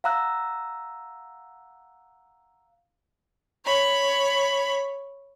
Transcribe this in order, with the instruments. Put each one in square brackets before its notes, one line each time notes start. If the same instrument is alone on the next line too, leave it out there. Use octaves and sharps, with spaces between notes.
[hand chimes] F5 F#5 A#5 E6 F#6
[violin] C#5 B5